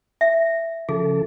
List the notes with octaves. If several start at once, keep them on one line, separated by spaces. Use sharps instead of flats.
E5
C#3 F3 G#4 A4